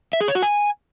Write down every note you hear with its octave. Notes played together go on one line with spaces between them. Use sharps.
E5
G#4
C#5
F#4
G#5